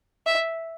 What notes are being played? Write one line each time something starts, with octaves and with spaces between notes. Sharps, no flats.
E5